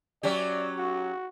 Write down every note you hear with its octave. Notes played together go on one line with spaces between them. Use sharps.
F#3 C#4 G4 D5
F#4